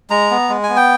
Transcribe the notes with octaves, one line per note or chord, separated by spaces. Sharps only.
G#3 A#5
B3
G#3
G#5
B3
G5